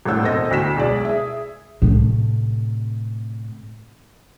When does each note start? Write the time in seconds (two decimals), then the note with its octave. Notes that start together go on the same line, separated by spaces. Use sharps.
0.05 G#1 A2 F#5 E6 G6
0.23 E1 C4 A4 D#5 A#6
0.51 D2 F#4 B6 E7
0.76 B1 G#3 D5
1.05 G#4 E5
1.82 A2 C3